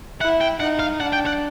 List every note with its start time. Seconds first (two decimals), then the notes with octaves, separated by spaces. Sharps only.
0.21 E4 F#5
0.41 G5
0.60 D#4 F#5
0.79 F5
1.00 D4 F#5
1.13 G5
1.26 F#5